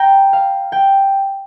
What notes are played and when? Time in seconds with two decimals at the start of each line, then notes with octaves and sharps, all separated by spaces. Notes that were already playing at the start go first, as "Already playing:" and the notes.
Already playing: G5 A#5
0.33 F5
0.72 G5